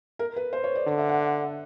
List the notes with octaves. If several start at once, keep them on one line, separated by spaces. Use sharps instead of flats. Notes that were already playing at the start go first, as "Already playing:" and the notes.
A#4
B4
C5
C#5
D5
D3
E5
F#5